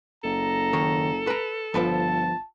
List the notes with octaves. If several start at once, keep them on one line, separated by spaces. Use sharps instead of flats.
F#1 A4 A#5
D#3 C#5
B4 A#5
G1 F3 B4 C5 A5